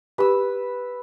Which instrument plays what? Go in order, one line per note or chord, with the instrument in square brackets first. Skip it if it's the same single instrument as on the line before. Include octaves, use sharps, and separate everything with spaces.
[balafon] G4 [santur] B4 E6